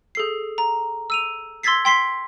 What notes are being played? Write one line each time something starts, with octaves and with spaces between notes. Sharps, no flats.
G#4 A4 C7
A#5
E6 D#7 F7
C6 E6 G#6 A6 B6 C7
G5 C6 B6 C7